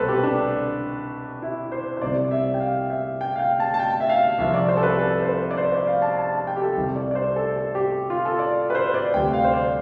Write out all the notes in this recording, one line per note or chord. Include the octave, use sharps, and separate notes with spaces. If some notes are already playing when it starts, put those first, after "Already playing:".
Already playing: C2 B2 G3 A4 B4 C5
G4
D4
E4
C5
C5
C2 C3 G3 D5
E5
G5
F5
E5
G5
F5
G5
A5
A5
G5
E5
F5
C2 C3 F3 E5
D5
C5
A4
B4
A4
C5
B4
D5
C5
D5
F5
A5
A5
A5
G5
G4
A4
C2 C3 G3
D5
D5
C5
A4
A4
G4
F4
A4
D5
B4
C5
D5
D2 C3 G3 G5
F5
C5
D5